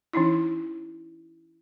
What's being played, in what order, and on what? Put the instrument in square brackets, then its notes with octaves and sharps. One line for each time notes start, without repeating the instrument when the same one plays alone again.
[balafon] E3 C#4 D#4 E4